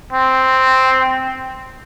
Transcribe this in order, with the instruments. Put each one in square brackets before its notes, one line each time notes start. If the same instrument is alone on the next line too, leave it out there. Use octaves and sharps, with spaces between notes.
[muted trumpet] C4